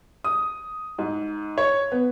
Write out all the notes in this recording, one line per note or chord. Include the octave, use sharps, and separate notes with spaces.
D#6
G#2
C#5
B3